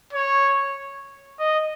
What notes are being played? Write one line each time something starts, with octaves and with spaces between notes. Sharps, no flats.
C#5
D#5